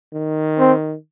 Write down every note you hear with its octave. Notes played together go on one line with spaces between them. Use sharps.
D#3
C4